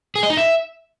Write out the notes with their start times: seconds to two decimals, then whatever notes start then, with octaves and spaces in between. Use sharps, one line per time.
0.15 G#4
0.23 D#5
0.30 D#4
0.37 E5